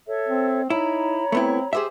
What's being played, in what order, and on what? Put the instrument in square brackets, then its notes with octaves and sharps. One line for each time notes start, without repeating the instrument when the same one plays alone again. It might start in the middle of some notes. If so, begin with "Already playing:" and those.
[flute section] A4 C#5 E5
[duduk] C4
[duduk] D#4 [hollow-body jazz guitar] E4 [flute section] C#5 A#5 B5
[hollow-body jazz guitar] A3 B3 E4 [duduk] C4
[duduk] G4 [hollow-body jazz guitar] G#4 C5 E5